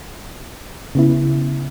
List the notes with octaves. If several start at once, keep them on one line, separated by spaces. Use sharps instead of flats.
C#3 B3 E4